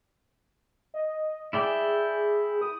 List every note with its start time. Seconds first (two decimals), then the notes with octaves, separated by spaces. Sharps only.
0.94 D#5
1.53 E4 G#4 D5 G5
2.61 D#6